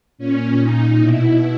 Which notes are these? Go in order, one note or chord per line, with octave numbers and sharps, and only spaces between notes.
A#2 C#4
A#2 D#4
B2 E4